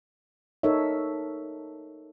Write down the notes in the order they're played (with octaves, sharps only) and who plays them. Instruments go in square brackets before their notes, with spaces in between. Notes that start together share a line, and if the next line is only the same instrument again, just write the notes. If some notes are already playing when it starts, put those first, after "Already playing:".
[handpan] D#4 A4 A#4 C#5 E5